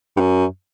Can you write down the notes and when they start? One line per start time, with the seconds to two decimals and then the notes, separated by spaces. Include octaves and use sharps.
0.17 G2
0.20 F#2